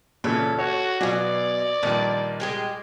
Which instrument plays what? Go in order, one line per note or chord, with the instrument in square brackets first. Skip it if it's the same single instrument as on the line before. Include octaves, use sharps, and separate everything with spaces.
[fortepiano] A#2 C#3 E3 [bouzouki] A4
[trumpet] F#4 [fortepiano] C#5
[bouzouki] B2 G#5 [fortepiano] F#3 F5 [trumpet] D5
[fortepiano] A#1 G2 [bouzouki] D#3 A#4 A5
[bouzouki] G#3 G4 G#4